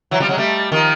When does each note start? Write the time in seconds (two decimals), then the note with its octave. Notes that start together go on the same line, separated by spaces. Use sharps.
0.11 E3 F#3
0.20 F3 G3
0.29 F#3 G#3
0.37 G3 A3
0.72 D#3 F3